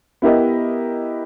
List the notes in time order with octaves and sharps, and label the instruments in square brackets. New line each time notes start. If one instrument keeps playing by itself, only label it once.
[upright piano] B3 E4 G4 A#4 D#5